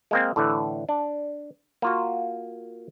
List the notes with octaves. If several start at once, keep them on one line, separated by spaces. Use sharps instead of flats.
G#3 A#3 C4
A2 D3 E3
D4
A#3 F4 F#4